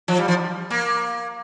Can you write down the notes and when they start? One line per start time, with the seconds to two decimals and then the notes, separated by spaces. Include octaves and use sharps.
0.08 F3
0.19 G3
0.28 F3
0.70 A#3